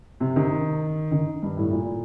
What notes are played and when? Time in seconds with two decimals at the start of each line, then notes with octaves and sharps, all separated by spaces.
0.20 C3
0.36 D#3
1.11 D#3
1.42 G2
1.57 A2
1.72 A#2